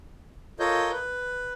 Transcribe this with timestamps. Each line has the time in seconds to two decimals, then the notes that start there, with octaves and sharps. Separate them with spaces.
0.60 F4 A4 A#4 C#5 D#5 G6
0.91 B4